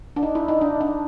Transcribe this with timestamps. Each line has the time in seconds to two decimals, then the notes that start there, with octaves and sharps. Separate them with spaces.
0.16 D4
0.23 D#4
0.35 E4
0.48 D#4
0.61 D4
0.81 D4